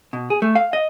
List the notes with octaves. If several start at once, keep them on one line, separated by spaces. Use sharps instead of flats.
B2
G#4
A3
F5
D#5